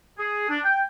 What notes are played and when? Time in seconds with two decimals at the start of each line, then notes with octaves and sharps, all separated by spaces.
0.18 G#4
0.49 D4
0.64 G5